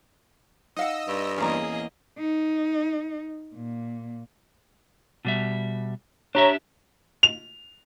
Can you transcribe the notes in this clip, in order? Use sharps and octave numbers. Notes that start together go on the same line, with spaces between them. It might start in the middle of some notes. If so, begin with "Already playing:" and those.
D#4 D#5 F5 F#5 E6
G2
E2 A#3 C#4 G#4 D#5 A#5
D#4
A#2
B2 G3 E5
D4 G4 C#5 E5 A#5
F7